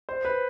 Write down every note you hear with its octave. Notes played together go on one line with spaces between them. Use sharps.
C5
B4